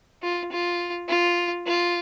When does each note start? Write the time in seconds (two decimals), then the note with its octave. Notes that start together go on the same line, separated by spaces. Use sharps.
0.23 F4
0.52 F4
1.09 F4
1.67 F4